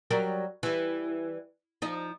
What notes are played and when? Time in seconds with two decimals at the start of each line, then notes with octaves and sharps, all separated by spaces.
0.11 F#3 G3 A#4
0.63 E3 G3
1.82 F3 D#4